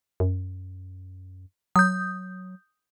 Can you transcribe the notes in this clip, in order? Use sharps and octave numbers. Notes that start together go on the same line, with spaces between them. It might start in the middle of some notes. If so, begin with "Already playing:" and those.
F#2
F#3 D#6 G6